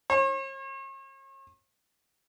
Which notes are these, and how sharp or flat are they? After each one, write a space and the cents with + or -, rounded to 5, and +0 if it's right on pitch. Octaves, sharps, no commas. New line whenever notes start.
C#5 -45